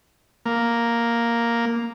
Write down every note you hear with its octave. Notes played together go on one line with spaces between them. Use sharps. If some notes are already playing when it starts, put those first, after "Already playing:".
A#3